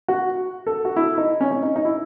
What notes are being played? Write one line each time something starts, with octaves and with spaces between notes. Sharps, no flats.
F#4
A4
F#4
E4
D#4
C#4
C#4
D#4
D#4
E4